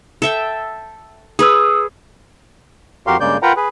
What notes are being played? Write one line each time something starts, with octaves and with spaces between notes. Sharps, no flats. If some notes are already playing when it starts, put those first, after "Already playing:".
A4 E5 G5
G#4 B4 C#5 D#6 E6
F2 F#4 G4 A#4 F5 C6
G2 C#3 G#3 A#3 D5 G6
F4 A#4 B4 F#5 G5 A#5
G#4 B4